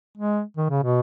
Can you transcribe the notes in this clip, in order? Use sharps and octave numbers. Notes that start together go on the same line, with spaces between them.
G#3
D#3
C#3
B2